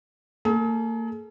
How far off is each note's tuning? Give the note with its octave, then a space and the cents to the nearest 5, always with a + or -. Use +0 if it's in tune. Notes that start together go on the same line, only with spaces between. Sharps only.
A#3 -40 G#4 +40